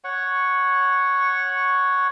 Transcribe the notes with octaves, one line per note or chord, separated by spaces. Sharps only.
C#5 F#5 C#6